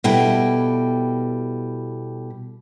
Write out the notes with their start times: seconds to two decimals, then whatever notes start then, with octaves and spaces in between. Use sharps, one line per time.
0.04 B2 G3 E4 A4 G5